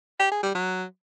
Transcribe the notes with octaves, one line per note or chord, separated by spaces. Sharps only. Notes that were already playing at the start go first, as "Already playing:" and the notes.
G4
G#4
G3
F#3